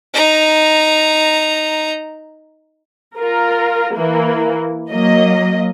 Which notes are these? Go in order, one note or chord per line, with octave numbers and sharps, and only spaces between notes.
D#4 A#5
F4 A#4
E3 A#3
F#3 A#3 D#5